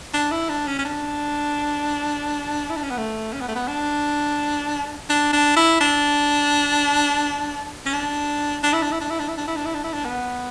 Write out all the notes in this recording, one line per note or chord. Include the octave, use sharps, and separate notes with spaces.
D4
E4
D4
C#4
C#4
D4
E4
D4
C#4
B3
A3
C#4
B3
A3
B3
D4
D4
D4
E4
D4
C#4
D4
D4
E4
D4
E4
D4
E4
D4
E4
D4
E4
D4
E4
D4
E4
D4
B3